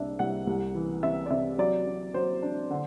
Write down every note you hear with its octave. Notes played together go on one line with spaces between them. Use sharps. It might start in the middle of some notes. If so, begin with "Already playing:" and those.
Already playing: C2 D4 E5
C2 F#5
C2
E3
C3 E5
D5
C3 E5
F#3 D5
F#3
F#3 C5
D4
D3